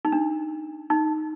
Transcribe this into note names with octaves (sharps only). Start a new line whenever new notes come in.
D#4
D4
D#4